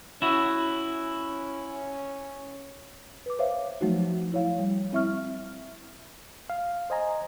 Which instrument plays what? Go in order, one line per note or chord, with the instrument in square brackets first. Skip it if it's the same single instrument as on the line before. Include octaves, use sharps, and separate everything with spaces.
[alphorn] C#4 [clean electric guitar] E4 F#4
[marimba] B4 D6
C5 C#5 E5 F5
F3 F#3 A3 D#4 F#4
E4 C#5 F5
G3
C4 E4 E5 C#6 F6
[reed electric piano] F5
C5 D#5 G#5 A#5